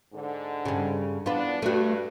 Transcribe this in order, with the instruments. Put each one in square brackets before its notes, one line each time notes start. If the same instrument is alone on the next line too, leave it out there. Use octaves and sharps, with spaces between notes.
[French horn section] G#2 D3
[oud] G2 C#3
[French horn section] E2 B3 D4 [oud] F4 B4
[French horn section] G2 [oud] A3 F#4